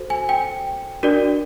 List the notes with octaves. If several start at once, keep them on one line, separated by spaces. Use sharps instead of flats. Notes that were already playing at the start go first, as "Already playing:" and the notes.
Already playing: F#4 A4 C5
G#5
G5
D4 F#4 A#4 D5